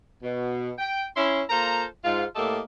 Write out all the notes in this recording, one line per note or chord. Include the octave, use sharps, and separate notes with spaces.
B2
G5
C#4 E4 C6
A#3 F4 A4 C5 A#5
G#2 F4
A2 A3 A#3 G4 A4 D#5